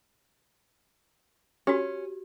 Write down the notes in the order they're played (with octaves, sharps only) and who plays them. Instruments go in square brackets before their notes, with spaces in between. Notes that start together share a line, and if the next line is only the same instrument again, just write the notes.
[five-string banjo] C#4 [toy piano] F#4 G4